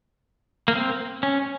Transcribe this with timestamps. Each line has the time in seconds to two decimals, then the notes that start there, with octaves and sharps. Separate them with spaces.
0.68 A#3
0.75 C4
1.23 C#4